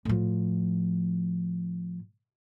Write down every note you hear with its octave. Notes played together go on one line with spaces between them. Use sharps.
A2 F3